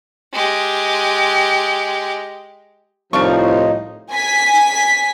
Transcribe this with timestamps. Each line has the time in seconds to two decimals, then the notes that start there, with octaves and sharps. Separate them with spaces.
0.33 G#3 G4
3.13 C2 A2 F3 D4 D#4 F5 C#6
4.12 G#5 B6